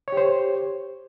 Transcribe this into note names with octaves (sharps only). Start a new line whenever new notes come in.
G4 C5 C#5